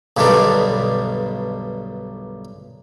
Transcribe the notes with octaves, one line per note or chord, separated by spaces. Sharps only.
B1 G2 B2 D3 D#3 G3